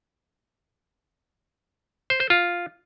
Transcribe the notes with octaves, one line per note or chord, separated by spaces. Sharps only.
C5
C5
F4